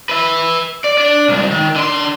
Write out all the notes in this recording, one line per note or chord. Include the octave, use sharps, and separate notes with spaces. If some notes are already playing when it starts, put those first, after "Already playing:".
B4 E5
D5
D4 D5
C2 G#2
D#3
D3 C6